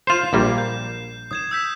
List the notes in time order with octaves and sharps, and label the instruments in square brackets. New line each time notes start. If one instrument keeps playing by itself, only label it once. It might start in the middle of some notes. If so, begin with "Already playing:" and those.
[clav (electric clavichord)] F4 C5 [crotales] G6 C7 E7
[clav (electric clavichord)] A#1 G3 A#3
[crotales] G6
D#6 G#6 E7
E6 G6 B6